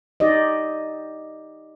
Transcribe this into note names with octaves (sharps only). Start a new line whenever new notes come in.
D#4 G4 D5 D#5